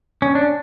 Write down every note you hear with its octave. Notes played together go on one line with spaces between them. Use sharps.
C#4
D4